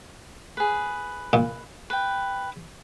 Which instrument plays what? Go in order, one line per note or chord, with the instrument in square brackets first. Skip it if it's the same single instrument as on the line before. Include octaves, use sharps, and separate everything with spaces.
[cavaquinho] G#4 B4
[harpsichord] A#2
[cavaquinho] B4 G5